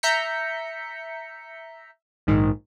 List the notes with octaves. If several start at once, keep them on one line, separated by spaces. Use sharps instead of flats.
E5 A#5 G6 B6 C#7
A#1 G#2 D#3